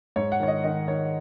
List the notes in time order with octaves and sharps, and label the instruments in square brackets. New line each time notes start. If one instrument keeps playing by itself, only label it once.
[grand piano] G#2 C#5
F#5
D#3 C#5
D#5
D#3 D#5
D#3 C#5